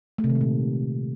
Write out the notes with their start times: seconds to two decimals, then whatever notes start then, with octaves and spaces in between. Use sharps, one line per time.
0.18 A3
0.24 C3
0.30 D#3
0.35 G#3
0.41 A#2